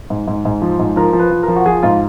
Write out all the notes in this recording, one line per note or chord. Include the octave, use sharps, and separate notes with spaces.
G#2
G#2
G#2
F3
G#2
F3 A#4
F3
B4
F3
F3 A#4
F#4
F3 G#4
G#2 F4